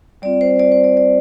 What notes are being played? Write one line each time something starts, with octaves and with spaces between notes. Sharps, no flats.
G3 C4 F4 D5
C5
D5
C5
D5
D5